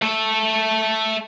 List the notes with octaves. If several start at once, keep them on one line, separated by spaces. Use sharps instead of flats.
A3 A4